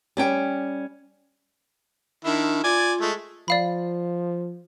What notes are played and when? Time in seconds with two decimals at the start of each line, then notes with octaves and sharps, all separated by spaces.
0.17 G3 C#4 G5
2.25 D#3 D4 E4
2.64 F4 D5 G#5
3.01 G#3 A3
3.48 F3 D5 F5 B5